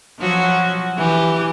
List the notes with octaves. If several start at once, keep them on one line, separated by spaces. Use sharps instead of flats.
F3 F#3 F#4
E3 G4